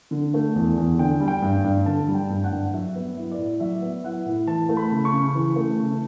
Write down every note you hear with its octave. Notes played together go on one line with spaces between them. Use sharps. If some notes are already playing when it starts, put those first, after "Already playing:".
D3
A3
E2
E2
D3 G5
G3
G5
G2
G2
D3 A5
G3
G5
G2
F#5
G2
F#3 E5
B3
E4
D5
A2
F#3 E5
B3
E4 F#5
A2
E3 A5
A3
B5
C#3
C#6
C#3
E3
A3
C#3